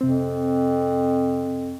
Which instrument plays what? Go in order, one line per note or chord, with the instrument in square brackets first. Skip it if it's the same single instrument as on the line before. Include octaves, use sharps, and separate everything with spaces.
[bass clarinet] F2 [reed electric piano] C3 C4